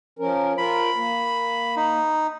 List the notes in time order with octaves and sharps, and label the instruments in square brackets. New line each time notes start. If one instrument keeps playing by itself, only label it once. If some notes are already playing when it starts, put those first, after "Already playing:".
[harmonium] F3 C#4 A#4
[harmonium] F4 A#4 [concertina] B5
[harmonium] A#3
[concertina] D#4